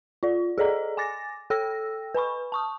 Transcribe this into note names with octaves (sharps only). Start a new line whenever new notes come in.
F4 D5
G#4 A4 D5 D#5 A#5
G#5 D6 A6 A#6
A4 G5 E6 A#6
B4 G#5 B5 C#6
A5 C#6 D#6